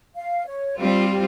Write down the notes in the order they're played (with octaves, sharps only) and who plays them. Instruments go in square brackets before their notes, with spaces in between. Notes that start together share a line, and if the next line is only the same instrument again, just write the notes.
[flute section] F5
C#5
[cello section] G3 C4 F4 [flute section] G4
[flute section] G4